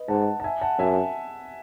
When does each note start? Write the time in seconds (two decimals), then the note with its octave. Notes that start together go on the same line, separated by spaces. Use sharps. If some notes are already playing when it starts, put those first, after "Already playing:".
Already playing: B4 D#5
0.08 G#2 F#5 A5
0.40 A5
0.44 E5 G#5
0.61 F#5 A5
0.79 F#2 E5 G#5